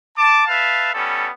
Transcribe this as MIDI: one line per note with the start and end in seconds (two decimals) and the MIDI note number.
0.18 0.45 81
0.18 0.45 86
0.48 0.91 71
0.48 0.91 76
0.48 0.91 77
0.48 0.91 81
0.93 1.29 55
0.93 1.29 59
0.93 1.29 61
0.93 1.29 69